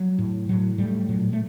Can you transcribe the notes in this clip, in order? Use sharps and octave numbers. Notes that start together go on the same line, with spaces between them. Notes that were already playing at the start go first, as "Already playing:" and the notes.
Already playing: F#3
A2
A2 F#3
A2 G3
A#2 F#3
A3